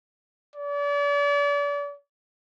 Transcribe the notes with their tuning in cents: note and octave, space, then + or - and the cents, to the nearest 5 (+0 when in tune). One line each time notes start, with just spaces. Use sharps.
D5 -40